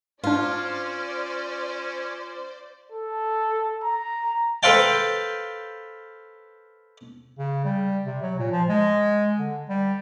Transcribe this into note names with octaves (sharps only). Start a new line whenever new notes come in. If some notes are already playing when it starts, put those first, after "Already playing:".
G#2 C#4 D4 F4 C5 D5
A4
A#5
A4 B4 C5 F5 G5 A5
C#3
G3
C3
F#3
A#2
F3
G#3
D3
G3